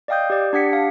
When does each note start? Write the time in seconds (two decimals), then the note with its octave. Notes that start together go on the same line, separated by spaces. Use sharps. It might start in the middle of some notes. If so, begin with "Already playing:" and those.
0.08 D5 D#5 F5 G5 D#6 G6
0.30 G4 D5
0.53 D4 G4 F#5 B6 C#7
0.73 F5 A5